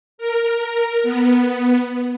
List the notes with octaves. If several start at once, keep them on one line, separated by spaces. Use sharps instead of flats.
A#4
B3